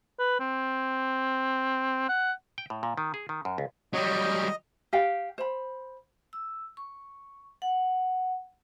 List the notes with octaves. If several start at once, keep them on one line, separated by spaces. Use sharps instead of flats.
B4
C4
F#5
G5
A2
A#2
D#3
G#4
D#3
F#2
C#2
F#3 G3 D#5
G4 F5 G5
C5 B5
E6
C#6
F#5